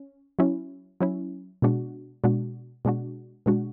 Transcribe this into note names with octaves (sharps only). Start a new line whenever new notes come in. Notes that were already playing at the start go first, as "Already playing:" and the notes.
Already playing: C#4
F#3 C#4 E4
F#3 C#4 E4
B2 G#3 D4 F#4
B2 G#3 D4 F#4
B2 G#3 D4 F#4
B2 G#3 D4 F#4